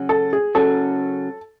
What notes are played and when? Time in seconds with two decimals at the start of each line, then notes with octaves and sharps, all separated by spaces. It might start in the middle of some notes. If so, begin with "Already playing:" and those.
Already playing: C#3 F#3 C#4 F#4
0.09 A4
0.33 G#4
0.55 C#3 F#3 C#4 F#4 A4